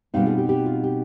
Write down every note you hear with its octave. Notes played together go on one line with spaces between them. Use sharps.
B2 G3 C4 D#4 D5 F5
F4 G#4
G4
G4
F4
G4